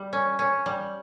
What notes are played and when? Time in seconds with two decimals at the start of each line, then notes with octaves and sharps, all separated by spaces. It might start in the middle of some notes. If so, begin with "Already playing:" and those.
Already playing: G3
0.13 C#4
0.39 C#4
0.66 G3